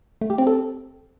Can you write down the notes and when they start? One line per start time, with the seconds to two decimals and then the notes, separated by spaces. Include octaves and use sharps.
0.21 A3
0.30 G4
0.38 C4
0.47 A4